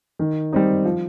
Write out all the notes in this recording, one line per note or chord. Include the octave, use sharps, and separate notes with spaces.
D#3
G3 C4 D#4
F3